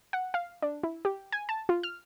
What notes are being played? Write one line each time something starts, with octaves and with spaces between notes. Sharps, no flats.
F#5
F5
D4
E4
G4
G#5
A5
F4
F6